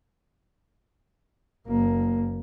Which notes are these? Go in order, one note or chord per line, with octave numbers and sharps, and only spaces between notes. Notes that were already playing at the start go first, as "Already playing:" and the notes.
F#1 A#3